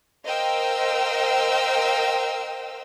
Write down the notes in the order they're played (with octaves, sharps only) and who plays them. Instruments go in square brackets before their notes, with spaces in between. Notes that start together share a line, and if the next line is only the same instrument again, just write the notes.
[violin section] A#4 C5 D#5 F5 G5 E6